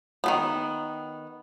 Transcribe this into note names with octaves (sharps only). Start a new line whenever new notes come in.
D#3 F#3 B3